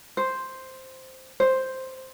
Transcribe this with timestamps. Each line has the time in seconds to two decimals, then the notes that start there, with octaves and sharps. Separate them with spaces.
0.17 C5
1.40 C5